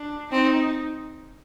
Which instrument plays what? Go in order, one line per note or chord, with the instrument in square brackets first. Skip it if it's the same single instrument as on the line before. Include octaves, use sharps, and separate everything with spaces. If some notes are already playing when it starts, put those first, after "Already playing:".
Already playing: [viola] D4
[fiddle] C4 [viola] D#4